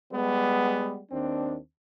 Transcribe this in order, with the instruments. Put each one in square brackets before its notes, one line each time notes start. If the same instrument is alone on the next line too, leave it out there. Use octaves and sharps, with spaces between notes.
[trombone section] G3 G#3 B3
D#2 C4 D4